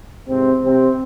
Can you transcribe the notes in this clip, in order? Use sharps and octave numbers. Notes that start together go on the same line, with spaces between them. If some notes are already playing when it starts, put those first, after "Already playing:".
G#2 C3 E3 C4
C3 C4